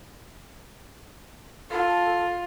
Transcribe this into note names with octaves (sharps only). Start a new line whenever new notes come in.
F4 A4